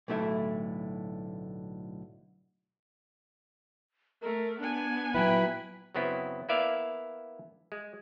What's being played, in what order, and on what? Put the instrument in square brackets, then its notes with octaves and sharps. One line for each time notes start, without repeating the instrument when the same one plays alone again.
[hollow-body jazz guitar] B1 A2 D3 A3 E4 E5
[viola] A3 [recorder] A#4
[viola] B3 G#5 [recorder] D4
[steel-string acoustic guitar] A#2 F#3 E4 [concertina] B4 [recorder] G5
[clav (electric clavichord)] F#2 C#3 B3 C4 E4
A#3 B3 E4 D5 E5 F5
G#3